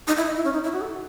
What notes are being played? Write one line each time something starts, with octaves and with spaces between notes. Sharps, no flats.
D#4
E4
D#5
E4
C#4
D#4
E4
F#4
A4